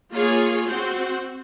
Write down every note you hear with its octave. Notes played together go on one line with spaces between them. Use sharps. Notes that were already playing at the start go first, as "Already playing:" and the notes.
A#3 F4 G#4 C#5
C4 F#4 C5